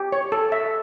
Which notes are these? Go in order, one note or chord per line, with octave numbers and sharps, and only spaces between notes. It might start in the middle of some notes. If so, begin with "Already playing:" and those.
Already playing: G4
C#5
A4
E5